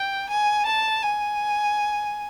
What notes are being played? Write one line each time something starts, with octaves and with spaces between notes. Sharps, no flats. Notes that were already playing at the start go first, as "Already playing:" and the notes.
Already playing: G5
G#5
A5
G#5